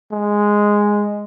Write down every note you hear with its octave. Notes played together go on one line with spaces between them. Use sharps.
G#3